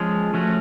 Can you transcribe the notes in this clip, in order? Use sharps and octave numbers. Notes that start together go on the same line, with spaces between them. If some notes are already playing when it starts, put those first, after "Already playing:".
Already playing: F3 G#3 C#4
F3 A3 C#4 F#4